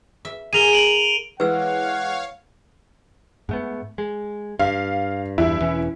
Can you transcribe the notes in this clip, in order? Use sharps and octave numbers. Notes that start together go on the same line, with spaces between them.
E5
G#4 A#4 D#7 F7 G7
D7 F#7
E3 G#3 B4 C#5 F5 F#5 E6
G#2 A3 B3
G#3
G2 F5
E2 G2 E4
E1 E3 C#4